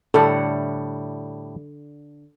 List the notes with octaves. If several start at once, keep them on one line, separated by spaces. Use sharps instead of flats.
A2 D3 G3 A4 F#5